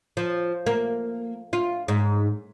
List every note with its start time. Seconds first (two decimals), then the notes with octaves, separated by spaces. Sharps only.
0.17 F3
0.66 A#3
1.53 F4
1.88 G#2